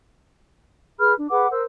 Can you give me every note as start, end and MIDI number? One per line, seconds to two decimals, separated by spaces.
0.99 1.14 68
0.99 1.14 71
0.99 1.14 83
0.99 1.14 89
1.17 1.27 62
1.30 1.49 68
1.30 1.49 71
1.30 1.49 78
1.30 1.49 86
1.51 1.63 70
1.51 1.63 72
1.51 1.63 88